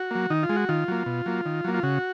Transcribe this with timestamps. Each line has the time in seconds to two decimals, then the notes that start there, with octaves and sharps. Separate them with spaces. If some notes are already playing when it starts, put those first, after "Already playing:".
Already playing: F#4
0.11 F#3 A#3
0.30 D#3 D#4
0.43 F4
0.49 G#3
0.56 F#4
0.69 D#3 F4
0.88 F#3 A#3
1.06 B2
1.26 F#3 A#3
1.46 D#3
1.64 F#3 A#3
1.74 F4
1.83 C#3 F#4